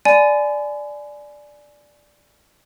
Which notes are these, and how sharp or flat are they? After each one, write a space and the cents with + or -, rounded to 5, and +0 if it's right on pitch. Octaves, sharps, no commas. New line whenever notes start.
D5 +0 G#5 +20 B5 +40